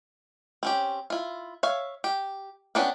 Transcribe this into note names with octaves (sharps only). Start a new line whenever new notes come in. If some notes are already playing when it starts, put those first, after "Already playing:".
C4 C#4 G4
E4 F4
C#5 E5 F5
G4
B3 C#4 D4 E4 G4